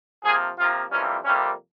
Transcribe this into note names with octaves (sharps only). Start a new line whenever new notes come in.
C3 F3 A#3 G#4
C3 F3 A#3 F4
F2 C3 E3 G3 A#3 C#4
F2 C3 G3 A#3 C#4